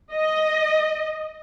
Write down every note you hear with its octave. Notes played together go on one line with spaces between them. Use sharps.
D#5